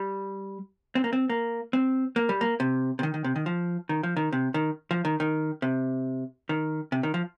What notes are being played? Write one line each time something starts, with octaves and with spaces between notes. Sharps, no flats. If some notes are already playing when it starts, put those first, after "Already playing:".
Already playing: G3
C4
A#3
C4
A#3
C4
A#3
G3
A#3
C3
C3
D#3
D#3
C3
D#3
F3
D#3
F3
D#3
C3
D#3
F3
D#3
D#3
C3
D#3
C3
D#3
F3